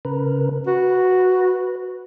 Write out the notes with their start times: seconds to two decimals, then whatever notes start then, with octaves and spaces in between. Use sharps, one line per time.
0.05 C#3 A#4 B4
0.67 F#4 B4